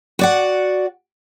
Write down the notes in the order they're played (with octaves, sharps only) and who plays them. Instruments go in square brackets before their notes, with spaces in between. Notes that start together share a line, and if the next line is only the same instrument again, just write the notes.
[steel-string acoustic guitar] F#4 D5 F#5